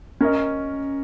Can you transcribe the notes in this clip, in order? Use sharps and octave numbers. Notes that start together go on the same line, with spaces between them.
C#4 A#4 D#5